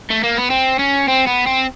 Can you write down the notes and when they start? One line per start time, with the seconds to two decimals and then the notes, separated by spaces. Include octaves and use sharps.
0.11 A3
0.24 A#3
0.37 B3
0.50 C4
0.79 C#4
1.08 C4
1.27 B3
1.47 C4